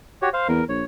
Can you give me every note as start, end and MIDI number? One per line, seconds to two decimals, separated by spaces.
0.22 0.29 66
0.22 0.29 67
0.22 0.29 73
0.33 0.48 72
0.33 0.48 77
0.48 0.62 40
0.48 0.64 70
0.69 0.83 34
0.69 0.85 73